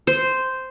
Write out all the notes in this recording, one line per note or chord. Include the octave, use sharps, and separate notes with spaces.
C5